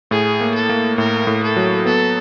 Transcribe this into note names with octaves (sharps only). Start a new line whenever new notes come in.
A2 G#4
A#3
A4
A#3
A2 A#4
A2
A4
F#3
B3 A4